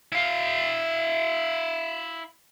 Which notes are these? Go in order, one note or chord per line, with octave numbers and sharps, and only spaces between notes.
E4 F5